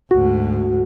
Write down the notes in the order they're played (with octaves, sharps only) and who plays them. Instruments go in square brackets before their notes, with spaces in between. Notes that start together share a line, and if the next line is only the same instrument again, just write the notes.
[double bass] D2 G#2 [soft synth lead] F#4